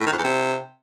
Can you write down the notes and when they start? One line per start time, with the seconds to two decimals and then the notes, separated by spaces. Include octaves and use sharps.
0.01 A2
0.06 D#3
0.12 F2
0.18 E2
0.24 C3